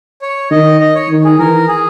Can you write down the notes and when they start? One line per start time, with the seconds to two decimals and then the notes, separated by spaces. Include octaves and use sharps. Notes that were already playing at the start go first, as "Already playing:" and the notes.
0.22 C#5
0.51 D#3 D#5
0.81 D#5
0.95 C#5
1.09 D#3
1.25 G#4
1.39 E3 A#4
1.68 G#4